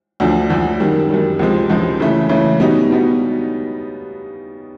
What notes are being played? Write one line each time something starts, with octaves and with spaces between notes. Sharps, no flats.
D2 D3 F3
D2 D3 F3
F#2 D#3 G3
F#2 D#3 G3
C#2 C3 F3 G#3 C4
C#2 C3 F3 G#3 C4
C#3 E3 A3
C#3 E3 A3
B2 G3 B3 D#4
B2 G3 B3 D#4